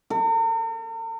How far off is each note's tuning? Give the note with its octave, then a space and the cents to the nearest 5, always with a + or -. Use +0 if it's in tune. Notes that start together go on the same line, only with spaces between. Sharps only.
A#4 -45